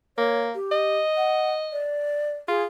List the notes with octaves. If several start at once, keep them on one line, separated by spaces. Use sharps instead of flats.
A#3 C#5
G4
D#5
F#5
D5
F4 G#4